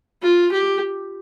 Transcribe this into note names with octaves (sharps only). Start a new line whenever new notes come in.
F4
G4